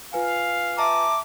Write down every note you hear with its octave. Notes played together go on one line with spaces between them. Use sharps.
F4 B4 F5 G#5
E5 A5 A#5 D6